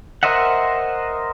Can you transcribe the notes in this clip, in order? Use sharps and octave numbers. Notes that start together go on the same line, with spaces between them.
A#4 C5 D#5 E5 F#5